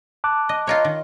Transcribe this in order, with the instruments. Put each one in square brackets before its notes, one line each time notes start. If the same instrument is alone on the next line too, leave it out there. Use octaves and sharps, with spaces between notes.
[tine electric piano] A5 D6 F#6
[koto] D#5
[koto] F4 A#4 C#5 [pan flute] D#5
[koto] D#3